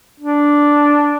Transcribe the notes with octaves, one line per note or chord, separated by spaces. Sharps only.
D4